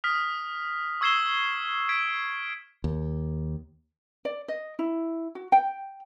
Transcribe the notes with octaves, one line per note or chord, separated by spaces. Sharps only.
D#6 F6 B6
C#6 E6 G#6 C7 E7 G7
G#6 B6 D7
D#2
D5
D#5
E4
F#4
G5